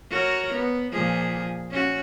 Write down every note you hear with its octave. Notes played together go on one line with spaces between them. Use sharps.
F#4 A#4 C#5
B3
A#2 F3 G#4
C#4 F#4